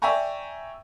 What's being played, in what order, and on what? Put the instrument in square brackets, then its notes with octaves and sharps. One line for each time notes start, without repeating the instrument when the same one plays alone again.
[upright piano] D5 E5 G5 G#5 A#5 C#6